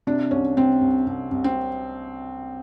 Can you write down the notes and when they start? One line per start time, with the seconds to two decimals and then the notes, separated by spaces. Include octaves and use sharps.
0.07 C3 D4
0.31 C2 C#4
0.57 C3 C4
0.81 C2
1.06 C2
1.32 C2
1.44 C4